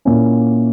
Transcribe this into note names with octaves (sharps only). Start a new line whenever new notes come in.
A#2 A#3 C#4 E4